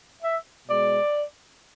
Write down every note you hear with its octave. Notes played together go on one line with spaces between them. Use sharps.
E5
B2 G#3 D5